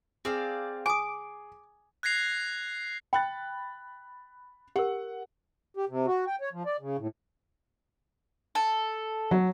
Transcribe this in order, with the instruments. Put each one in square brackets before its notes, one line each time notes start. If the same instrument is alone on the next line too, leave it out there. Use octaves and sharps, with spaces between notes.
[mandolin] C4 D5 F5 [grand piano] G#4
[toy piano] G#5 D#6 [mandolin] D6
[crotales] F#6 G#6 A#6 C7 F7
[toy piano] G5 [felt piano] B5 F#6 A6
[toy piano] G4 A#4 [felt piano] F#5
[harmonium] G4
C3
F#4
G5
C#5
F3
D5
C#3
A2
[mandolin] A4
[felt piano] F#3